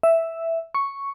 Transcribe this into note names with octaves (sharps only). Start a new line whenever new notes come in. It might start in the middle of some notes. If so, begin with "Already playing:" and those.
E5
C#6